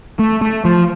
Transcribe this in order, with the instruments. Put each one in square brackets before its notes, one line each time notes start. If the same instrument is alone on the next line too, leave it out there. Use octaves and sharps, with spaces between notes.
[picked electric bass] A3
A3
F3